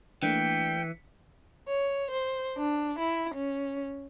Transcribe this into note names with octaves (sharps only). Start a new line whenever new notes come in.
E3 A3 A#3 D4 G5 B6 C#7
C#5
C5
D4
E4
C#4